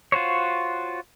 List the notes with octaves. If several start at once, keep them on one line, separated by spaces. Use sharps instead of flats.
F4 F#4 C5 C#5